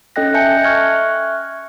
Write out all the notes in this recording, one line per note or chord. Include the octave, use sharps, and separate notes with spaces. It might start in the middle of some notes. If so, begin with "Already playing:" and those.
C#4 A4 D#5 G5 F#6 A#6
E5 G#5 A5 G6 C#7
E5 C#6 F6 F#6 G#6